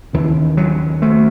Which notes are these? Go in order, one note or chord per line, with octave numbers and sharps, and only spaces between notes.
D#2 C#3 E3
F#3
A3